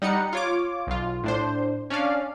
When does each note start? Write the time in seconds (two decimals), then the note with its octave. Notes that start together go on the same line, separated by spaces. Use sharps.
0.02 G3 D#4 F#5 C#7
0.33 F4 C#5 D6
0.87 B1 F4
1.24 A2 D4 C5
1.90 C#4 D4 D5 F5